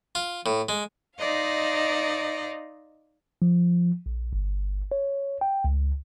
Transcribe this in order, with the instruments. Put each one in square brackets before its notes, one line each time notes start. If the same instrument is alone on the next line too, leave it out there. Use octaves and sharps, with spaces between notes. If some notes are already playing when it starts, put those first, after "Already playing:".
[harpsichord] F4
A2
G#3
[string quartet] D#4 C5 D5 D#5 F5
[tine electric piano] F3
A#1
G1
C#5
G5
C#2